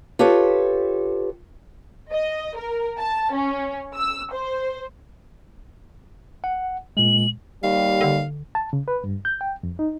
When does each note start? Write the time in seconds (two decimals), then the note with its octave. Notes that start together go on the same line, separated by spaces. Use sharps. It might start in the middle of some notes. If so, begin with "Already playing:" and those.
0.19 F4 G4 A4 B4 C#5
2.12 D#5
2.57 A#4
2.99 A5
3.33 C#4
3.96 E6
4.32 C5
6.44 F#5
6.97 A#2 G#3 F#7
7.63 D#2 G3 F5
8.01 D3
8.55 A5
8.73 C#3
8.88 B4
9.04 G2
9.25 G6
9.41 G5
9.63 F2
9.79 D#4